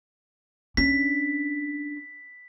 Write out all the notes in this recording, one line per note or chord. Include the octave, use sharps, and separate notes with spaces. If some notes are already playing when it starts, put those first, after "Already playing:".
C#4 D4 B6